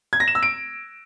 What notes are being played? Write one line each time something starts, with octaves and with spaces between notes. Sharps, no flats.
G#6
A#6
E7
E6
D7